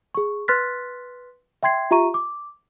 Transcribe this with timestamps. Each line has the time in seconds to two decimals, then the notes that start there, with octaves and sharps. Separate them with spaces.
0.15 G#4 C#6
0.48 B4 C6 F6 F#6 A6 B6
1.63 E5 G5 C6 G#6 C7
1.91 F4 G4 E5 A#5 C#6 D#7
2.14 D6